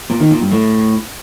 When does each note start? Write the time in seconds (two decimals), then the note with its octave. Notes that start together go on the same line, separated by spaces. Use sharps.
0.10 A#2
0.20 D#3
0.31 A#2
0.41 G2
0.51 A2